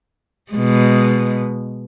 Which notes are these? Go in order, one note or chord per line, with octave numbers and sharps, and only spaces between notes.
B2 G#3